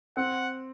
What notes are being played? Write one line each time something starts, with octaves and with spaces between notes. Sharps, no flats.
C4 F#5